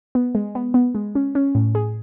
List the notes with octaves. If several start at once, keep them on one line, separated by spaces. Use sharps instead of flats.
B3
G#3
B3
B3
G#3
C#4
C#4
A2
G#4